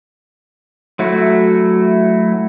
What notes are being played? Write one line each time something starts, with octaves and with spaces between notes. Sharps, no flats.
F#3 A3 E4 F#4